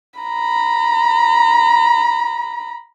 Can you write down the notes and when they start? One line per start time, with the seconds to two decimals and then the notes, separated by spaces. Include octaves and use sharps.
0.20 A#5 B5